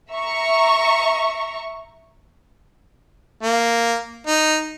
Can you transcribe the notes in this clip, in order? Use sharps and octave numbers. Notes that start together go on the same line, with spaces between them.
E5 A#5 C#6
A#3
D#4